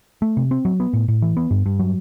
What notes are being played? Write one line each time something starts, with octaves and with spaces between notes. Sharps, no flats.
A3
C3
C4
F#3
B3
A2
A2
E3
B3
G2
G2
F#3